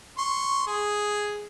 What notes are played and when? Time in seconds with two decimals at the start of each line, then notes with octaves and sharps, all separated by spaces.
0.18 C6 C#6
0.67 G#4